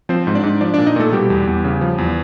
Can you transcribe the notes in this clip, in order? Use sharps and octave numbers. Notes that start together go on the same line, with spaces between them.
F3 C4 C5
G#2
D4 D5
G#2
F3 D4 D5
A#2 D4 D5
D#4 D#5
A#2 A3 A4
B2 G3 G4
E2
E2
C#3
F3
E2